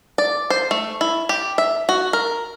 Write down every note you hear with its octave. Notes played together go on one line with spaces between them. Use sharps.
D5
C5
A3
E4
G4
E5
F#4
A#4